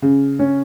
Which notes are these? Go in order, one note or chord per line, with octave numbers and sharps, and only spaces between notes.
C#3
C#4